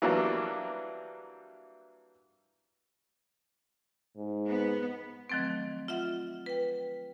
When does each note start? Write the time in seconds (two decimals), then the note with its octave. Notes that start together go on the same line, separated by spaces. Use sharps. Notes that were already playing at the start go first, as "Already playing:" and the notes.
0.02 E3 F#3 G3 A#3 D4
4.17 G#2
4.49 B3
5.30 D#3 F3 F#3 A3 C4
5.88 F4 E5 F#5
6.46 B4 G5